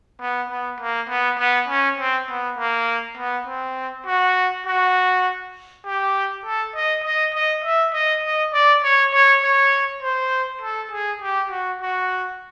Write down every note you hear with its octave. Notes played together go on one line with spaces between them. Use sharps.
B3
B3
A#3
B3
B3
C#4
C4
B3
A#3
B3
C4
F#4
F#4
G4
A4
D#5
D#5
D#5
E5
D#5
D#5
D5
C#5
C#5
C#5
C5
A4
G#4
G4
F#4
F#4